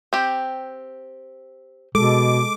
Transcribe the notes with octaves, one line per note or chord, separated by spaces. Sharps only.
C4 G4
B2 G#3 A4 D6